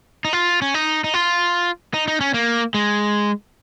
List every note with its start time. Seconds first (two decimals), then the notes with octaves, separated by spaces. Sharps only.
0.25 D#4
0.33 F4
0.62 C#4
0.74 D#4
1.04 D#4
1.14 F4
1.94 D#4
2.08 D#4
2.21 C#4
2.34 A#3
2.74 G#3